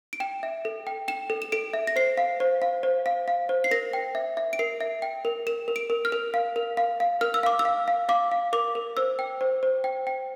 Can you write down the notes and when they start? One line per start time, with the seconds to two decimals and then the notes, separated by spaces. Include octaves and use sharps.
0.13 D7
0.20 G5 E7
0.43 E5
0.65 A4
0.87 G5
1.08 G5 E7
1.30 A4
1.42 E7
1.52 A4 D7
1.73 E5
1.87 A#6
1.96 C5 C7
2.17 F5
2.40 C5
2.62 F5
2.83 C5
3.06 F5
3.28 F5
3.49 C5
3.64 C7
3.71 A#4 A#6
3.93 G5
4.15 E5
4.37 E5
4.53 D7
4.59 A#4 C7
4.81 E5
5.02 G5
5.25 A#4
5.47 A#4 E7
5.68 A#4
5.76 D7
5.90 A#4
6.05 F6
6.12 A#4
6.34 F5
6.56 A#4
6.77 F5
7.00 F5
7.21 A#4 F6
7.34 E6
7.43 F5 D6
7.59 E6
7.65 F5
7.88 F5
8.09 F5 D6
8.32 F5
8.53 A#4 D6
8.75 A#4
8.97 C5 E6
9.19 G5
9.41 C5
9.63 C5
9.84 G5
10.07 G5